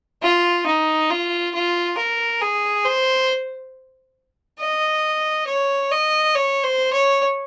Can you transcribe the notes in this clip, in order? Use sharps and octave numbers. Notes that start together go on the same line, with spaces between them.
F4
D#4
F4
F4
A#4
G#4
C5
D#5
C#5
D#5
C#5
C5
C#5